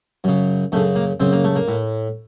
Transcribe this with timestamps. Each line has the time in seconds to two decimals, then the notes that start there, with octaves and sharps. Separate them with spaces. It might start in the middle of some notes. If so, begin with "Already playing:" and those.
0.24 F#2 C#3
0.72 F#2 A3
0.76 C#3
0.96 A#3
1.20 F#2 C#3 C4
1.32 A#3
1.44 A3
1.56 A#3
1.68 A2